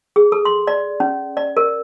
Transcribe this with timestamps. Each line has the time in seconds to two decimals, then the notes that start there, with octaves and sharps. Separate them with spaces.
0.16 G#4
0.32 A4
0.45 C6
0.67 D5
1.00 C#4
1.37 D5
1.57 A#4